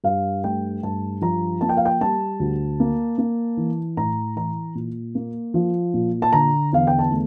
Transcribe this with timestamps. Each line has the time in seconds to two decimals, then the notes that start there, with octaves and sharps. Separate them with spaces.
0.04 G2 F5
0.44 A3 G5
0.83 G2 A5
1.21 F3 A#5
1.61 A#3 A5
1.69 G5
1.77 F5
1.85 G5
2.01 G3 A5
2.40 D2
2.80 A#3
3.18 A#3
3.57 E3
3.97 A2 A#5
4.36 E3 A#5
4.75 A#2
5.15 A#3
5.54 F3
5.94 A#2
6.22 A5
6.33 D3 A#5
6.73 E2 F5
6.87 G5
6.99 A5
7.11 A3